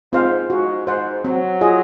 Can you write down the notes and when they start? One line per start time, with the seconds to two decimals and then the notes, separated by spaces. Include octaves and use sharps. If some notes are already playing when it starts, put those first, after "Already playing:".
0.12 G#2 C4 F4 C5 F5
0.50 G#2 F#4
0.87 G#2 C5 F#5
1.25 F#3 C4
1.61 F4 G#4 D#5